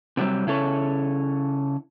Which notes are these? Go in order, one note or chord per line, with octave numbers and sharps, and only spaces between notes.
C3 F#3 G3 C4
C#3 E4 A4 C#5